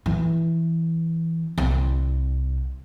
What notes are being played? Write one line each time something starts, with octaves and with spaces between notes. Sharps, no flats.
E3
C2